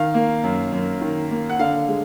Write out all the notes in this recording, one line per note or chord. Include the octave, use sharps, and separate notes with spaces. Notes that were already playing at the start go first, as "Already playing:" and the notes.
Already playing: D#3 F5
A#3
F#2
F#2
D#3
A#3
F#5
D3 F5
G#3